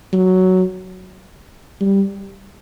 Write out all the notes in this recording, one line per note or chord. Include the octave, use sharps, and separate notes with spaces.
F#3
G3